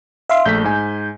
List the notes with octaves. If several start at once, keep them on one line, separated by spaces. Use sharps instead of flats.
E5 F5 C6
A#1 A3 G6 B6
G#2 G#5